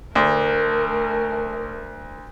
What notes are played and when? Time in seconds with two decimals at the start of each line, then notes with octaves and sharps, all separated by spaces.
0.15 D2 A3 A#4